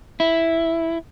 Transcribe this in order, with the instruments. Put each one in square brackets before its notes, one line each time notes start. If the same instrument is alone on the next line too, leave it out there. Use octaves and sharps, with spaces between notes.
[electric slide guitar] E4